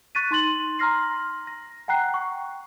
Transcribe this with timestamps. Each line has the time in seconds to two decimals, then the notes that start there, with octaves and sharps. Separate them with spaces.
0.15 C#6 F#6 A6 B6 D#7
0.31 D#4 C6 A6 F#7
0.79 A#5 C6 F6 A#6 C7
1.47 A#6
1.88 F#5 G5 A#5 F#6 C7
2.14 C#6